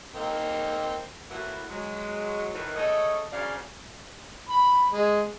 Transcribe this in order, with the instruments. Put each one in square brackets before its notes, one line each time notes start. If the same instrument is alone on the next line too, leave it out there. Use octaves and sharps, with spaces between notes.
[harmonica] A#3 C4 D#4
[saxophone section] A2 E3 A#3 B3 E4 F#4
F#3 G#3
A2 D#3 E3
C#3 A3 A4 C#5 D#5
F#2 C#3 D4 C5 D5 F5
[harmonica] B5
G#3